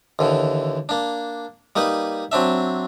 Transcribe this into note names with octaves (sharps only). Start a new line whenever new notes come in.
D#2 D3 E3
A#3 D4
G3 A#3 D#4 B4
F#3 C4 D4 E5